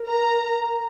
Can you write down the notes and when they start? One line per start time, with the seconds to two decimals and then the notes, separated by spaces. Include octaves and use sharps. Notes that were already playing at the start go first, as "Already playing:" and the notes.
Already playing: A#4
0.08 A#5